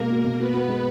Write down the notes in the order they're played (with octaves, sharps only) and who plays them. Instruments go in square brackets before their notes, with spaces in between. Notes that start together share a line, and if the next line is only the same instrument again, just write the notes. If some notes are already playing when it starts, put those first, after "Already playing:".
Already playing: [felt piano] B2 G#3 [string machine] A#3 A#4
[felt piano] F#4
B2
[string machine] B3 B4 [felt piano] F#4
[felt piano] F#4
G#3